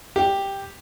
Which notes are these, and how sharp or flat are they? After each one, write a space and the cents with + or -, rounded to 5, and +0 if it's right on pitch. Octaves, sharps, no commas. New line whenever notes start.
G4 +5